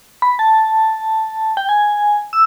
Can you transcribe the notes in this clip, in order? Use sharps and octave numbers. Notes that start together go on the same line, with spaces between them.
B5
A5
G5
G#5
E6